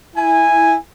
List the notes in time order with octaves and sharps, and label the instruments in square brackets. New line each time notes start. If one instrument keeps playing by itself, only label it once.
[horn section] E4 G#5